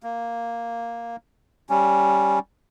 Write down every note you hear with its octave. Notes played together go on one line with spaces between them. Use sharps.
A#3
G3 C#4